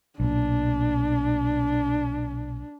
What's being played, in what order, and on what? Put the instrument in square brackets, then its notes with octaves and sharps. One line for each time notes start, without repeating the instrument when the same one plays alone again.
[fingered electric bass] B1 A#2 [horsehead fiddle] D4